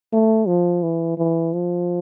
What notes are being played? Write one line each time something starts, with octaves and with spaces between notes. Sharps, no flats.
A3
F3
E3
E3
F3